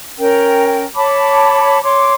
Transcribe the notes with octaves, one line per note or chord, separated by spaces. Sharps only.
C#4 A#4 G5
C#5 A5 B5 D6
C#5 C6 D6